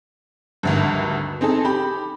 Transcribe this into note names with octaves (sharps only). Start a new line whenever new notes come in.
G#1 D2 G2
C4 D#4 G#4 A4
G4 B5